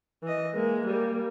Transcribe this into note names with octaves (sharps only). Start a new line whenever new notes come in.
E3 D#5
G#3 A#3
G3 A#3